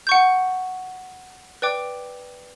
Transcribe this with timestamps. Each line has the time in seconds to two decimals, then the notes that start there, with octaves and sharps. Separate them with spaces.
0.07 F#5 C#6 G6
1.62 B4 D5 G5 D6